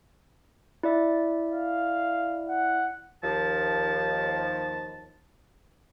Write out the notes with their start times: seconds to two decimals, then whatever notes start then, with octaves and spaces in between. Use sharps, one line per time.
0.83 E4 D5 E5
1.51 F5
2.49 F#5
3.24 D#2 F3 A5